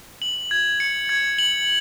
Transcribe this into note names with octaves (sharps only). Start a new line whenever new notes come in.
F#7
G#6
C#7
G#6
F#7